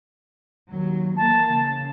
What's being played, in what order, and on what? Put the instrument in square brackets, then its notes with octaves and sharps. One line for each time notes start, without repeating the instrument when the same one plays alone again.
[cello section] D#2 F#3
[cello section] E3 A#3 [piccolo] A5
[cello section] C#3